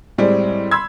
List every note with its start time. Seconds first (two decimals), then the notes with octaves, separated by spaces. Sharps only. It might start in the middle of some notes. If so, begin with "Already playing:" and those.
0.18 A2 G3 G#3 C4
0.71 B5 C6 E6 G#6